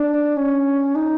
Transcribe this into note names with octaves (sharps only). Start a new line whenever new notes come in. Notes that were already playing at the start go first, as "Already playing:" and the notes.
Already playing: D4
C#4
D#4